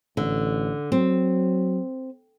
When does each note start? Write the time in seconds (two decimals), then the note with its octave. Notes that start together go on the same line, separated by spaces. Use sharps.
0.17 A1 D3
0.92 F#3 C4